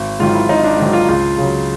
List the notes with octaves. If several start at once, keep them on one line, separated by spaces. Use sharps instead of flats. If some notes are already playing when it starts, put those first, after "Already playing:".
Already playing: G#1
G#2 D#3 F#3 F4
E4
G#1 D#4
D4
G#2 D#3 F#3
F4
C#2 F4
C#3 F#3